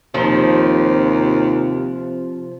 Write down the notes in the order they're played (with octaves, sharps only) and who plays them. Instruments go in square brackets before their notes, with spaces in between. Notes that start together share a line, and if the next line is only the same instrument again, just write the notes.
[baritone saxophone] D#2 [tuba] C3 [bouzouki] F3